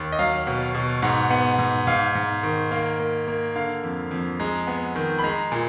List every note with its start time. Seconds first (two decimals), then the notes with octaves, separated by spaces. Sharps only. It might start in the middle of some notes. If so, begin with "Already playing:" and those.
Already playing: D#2
0.12 D#5
0.19 F#3 F5
0.47 B2
0.75 B2
1.02 G#2 F#5
1.31 B3
1.59 G#2
1.87 G#2 F5
2.15 G#2
2.43 D#3
2.71 A#3 F5
2.99 A#3
3.28 A#3
3.55 D3 F5
3.83 F2
4.11 F2
4.40 G#3 A#5
4.67 B3
4.95 D#3
5.19 B5
5.24 G#3 A#5
5.52 A#2